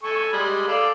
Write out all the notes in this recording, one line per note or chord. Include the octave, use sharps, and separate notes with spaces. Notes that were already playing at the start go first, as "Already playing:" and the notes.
A4 G#5 C#6
G3 G#3 B5
A4 D5 F5